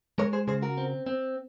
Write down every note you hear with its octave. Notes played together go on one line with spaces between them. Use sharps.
G#3 A#4 C#5
G#4 C5
C#3 G#4 C5
F#4 A#4
C4
C4